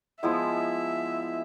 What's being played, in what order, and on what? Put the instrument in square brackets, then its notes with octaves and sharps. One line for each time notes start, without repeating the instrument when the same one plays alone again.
[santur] F3 G#3 B3 E4 [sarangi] E5